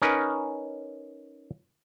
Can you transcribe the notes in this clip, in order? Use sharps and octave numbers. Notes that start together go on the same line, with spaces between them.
C#4 D#4 A#4 B4